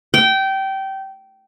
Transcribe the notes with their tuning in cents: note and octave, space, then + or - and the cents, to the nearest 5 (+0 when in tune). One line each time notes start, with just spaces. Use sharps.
G5 -20